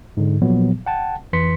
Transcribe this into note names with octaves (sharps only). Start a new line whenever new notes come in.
G#2 D3
A#2 F3 F#3 B3
F#5 G5 A5
F2 E3 B4 C6 B6 C#7